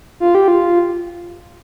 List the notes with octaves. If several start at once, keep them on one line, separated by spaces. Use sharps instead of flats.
F4
G4
F4